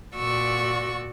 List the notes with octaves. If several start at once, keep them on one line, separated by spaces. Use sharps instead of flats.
A#2 F#4 D5 C#6 E6